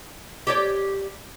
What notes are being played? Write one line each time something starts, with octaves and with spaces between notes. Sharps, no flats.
G4 C#5 D5